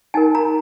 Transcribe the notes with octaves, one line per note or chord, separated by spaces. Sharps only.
D#4 A#4 G#5
A#5